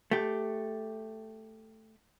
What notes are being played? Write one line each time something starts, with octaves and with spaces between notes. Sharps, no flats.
A3 G4